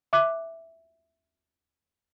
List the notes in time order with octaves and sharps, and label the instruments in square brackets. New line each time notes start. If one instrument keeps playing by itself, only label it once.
[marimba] E5 D6 F#6